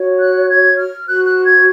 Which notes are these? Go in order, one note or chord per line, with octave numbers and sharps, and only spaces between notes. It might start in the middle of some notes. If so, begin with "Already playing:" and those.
Already playing: F#4 C#5
F#6
G#6
F6
F#4 C5 F#6
F#6
G#6